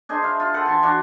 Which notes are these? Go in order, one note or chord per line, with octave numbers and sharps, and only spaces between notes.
D4 G#4 C5 D#5
E4 F5
F4
A4 B4 C5 F#5
E3 A5 C6
E3 D4 F#4 F5